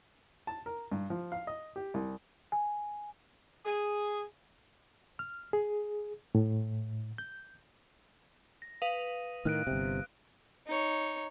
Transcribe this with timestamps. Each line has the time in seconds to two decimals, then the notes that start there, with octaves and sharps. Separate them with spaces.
0.47 A5
0.66 A#4
0.92 G2
1.10 F3
1.32 F5
1.47 D#5
1.76 G4
1.94 C2
2.52 G#5
3.65 G#4
5.19 F6
5.53 G#4
6.35 A2
7.18 G6
8.62 A#6
8.82 B4 F5 D#6 D#7
9.45 A2 D#3 F6 F#6 D7
9.67 G1 C3
10.66 D#4 C#5